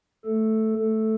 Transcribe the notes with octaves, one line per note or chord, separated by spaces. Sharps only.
A3 A4
A3 A4